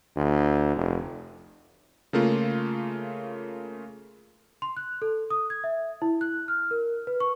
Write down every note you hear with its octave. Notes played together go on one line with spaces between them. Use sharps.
D2
F1
C#3 A3 A#3 F4
C6
F#6
A4
D#6
G#6
E5
E4
F#6
F6
A#4
B4
C#6